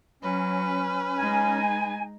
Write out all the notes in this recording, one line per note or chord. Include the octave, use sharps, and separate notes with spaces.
F#3 C#4 B4
G#3 D#4 G#5